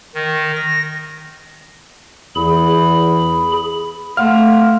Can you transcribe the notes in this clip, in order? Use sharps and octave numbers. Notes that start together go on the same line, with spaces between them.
D#3
A#6
E2 G#4 B5
A3 F5 F#5 C6 F6